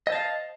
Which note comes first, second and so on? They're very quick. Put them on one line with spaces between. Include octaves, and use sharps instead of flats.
D#5 C5 A5 F5